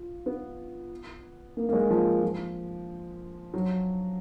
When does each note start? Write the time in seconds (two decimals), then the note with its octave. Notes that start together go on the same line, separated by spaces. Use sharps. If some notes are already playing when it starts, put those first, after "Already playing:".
Already playing: F4
0.26 B3
1.57 A#3
1.69 A#3
1.73 G#3
1.90 F3
2.23 F3
3.54 F#3